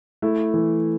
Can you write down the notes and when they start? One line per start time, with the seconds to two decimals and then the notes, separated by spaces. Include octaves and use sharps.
0.22 A3 E4
0.54 E3